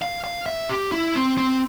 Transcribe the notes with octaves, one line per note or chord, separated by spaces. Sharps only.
F5
F5
E5
G4
E4
C4
C4